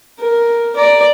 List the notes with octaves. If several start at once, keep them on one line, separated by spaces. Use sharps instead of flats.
A#4
D5 A#5